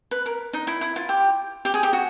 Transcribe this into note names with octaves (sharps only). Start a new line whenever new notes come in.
B4
A#4
D#4
E4
E4
F4
G4
G4
G#4
G4
F#4